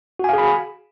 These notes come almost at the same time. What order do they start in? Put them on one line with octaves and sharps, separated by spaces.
F#4 G#5 F5 G#4 B5